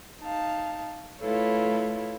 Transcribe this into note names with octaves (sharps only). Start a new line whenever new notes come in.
D#4 F5 A5
A3 E4 F4 A4 B4 C#5